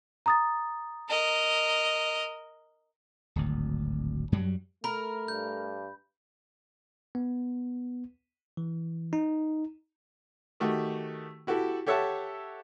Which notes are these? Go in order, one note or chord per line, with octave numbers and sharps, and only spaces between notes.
A#5 D#6 A6
A#4 D#5
D1 G#1 D2
F#2 F#3 G3
A3 A#4 B5
G2 G6
B3
E3
D#4
D#3 A3 F#4 G4
E4 F#4 G4 A4
G4 A4 C#5 E5 F#5 A5